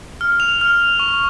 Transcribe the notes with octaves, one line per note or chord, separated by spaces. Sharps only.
F6
F7
F6
C#6